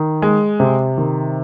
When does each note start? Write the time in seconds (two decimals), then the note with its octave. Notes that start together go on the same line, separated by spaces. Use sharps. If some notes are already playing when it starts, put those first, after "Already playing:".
Already playing: D#3
0.22 G#3
0.60 C3
0.98 D#3